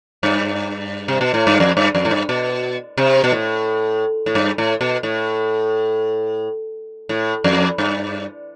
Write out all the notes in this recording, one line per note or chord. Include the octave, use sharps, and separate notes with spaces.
G2
C3
B2
A2
G2
F2
G2
F2
A2
G2
B2
C3
B2
A2
A2
G2
A2
B2
A2
A2
F2
G2